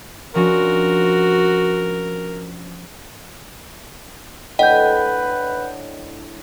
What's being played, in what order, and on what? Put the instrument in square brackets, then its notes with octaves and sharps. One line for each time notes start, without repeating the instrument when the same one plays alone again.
[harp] F3 C#4 D4 [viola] F#4 [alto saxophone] A#4
[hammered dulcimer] A2 D3 [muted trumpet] B4 [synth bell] D#5 G5 [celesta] F#5 G6